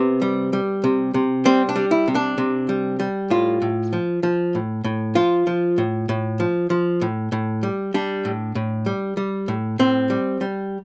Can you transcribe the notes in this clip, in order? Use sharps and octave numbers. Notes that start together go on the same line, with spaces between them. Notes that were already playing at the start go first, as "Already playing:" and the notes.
Already playing: C3 B3
G3
G3
C3
C3
G3 C4
D4
G3
E4
C3
D4
C3
G3
G3
A2 F4
A2
F3
F3
A2
A2
F3 F4
F3
A2
A2
F3
F3
A2
A2
G3
G3 D4
A2
A2
G3
G3
A2
A2 C4
G3
G3